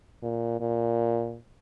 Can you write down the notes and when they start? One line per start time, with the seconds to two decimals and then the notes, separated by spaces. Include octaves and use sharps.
0.23 A#2
0.60 A#2